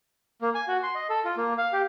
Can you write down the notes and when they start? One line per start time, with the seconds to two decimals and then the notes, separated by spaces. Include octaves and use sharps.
0.42 A#3
0.55 G#5
0.68 F#4
0.83 C6
0.95 D#5
1.10 A4
1.25 F4
1.37 A#3
1.58 F5
1.73 G4